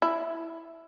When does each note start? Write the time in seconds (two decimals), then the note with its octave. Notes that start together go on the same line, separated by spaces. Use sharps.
0.02 E4